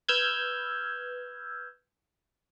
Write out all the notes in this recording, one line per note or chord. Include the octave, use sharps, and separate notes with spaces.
B4 E6 F6 G6 G#6